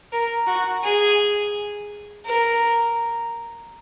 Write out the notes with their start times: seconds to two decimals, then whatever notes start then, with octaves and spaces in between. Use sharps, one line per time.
0.12 A#4
0.47 F#4
0.83 G#4
2.26 A#4